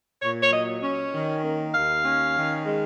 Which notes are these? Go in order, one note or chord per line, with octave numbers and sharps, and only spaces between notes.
A#2 C#5
C#5
F#3 D#5
C#4
D#3
A#3
D#2 F5
C#4
D#3
G#3